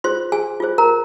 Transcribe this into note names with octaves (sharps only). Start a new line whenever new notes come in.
F4 G#4 C5 C6
G#4 G#5
F4 G#4 C5
A#4 A#5